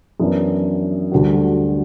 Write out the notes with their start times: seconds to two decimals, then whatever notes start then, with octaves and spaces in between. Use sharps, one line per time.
0.20 F#2 E3 B3 D4
1.12 D2 D3 G3 D4 F#4